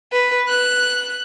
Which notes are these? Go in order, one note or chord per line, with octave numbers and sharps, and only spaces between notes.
B4
F#6